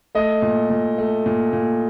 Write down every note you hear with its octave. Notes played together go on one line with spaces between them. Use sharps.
A3 D#5
A#2
A#2
A3
A#2
A#2